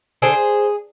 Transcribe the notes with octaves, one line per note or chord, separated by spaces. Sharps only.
D3 G#4 C5